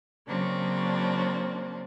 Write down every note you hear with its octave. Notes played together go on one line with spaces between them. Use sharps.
C#3 F#3 A#3 C4 D4